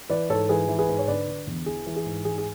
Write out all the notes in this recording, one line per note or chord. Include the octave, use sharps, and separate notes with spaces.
E3 B4 D5
G#2 A4 C#5
E3 G#4 B4
E3
G#4 B4
G#2
C#5
D3 B4 D5
D3
E2
E3 G#4
E3
G#4
G#2
E3 G#4
G#4